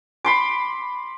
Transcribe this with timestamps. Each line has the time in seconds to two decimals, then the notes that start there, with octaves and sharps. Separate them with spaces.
0.25 B5 C6 D6